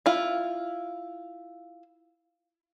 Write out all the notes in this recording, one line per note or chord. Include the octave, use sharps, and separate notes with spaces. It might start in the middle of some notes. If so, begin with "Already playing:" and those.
E4 F4